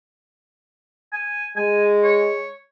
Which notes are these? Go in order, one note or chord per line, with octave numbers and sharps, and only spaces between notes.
G#5
G#3 G#5
C#5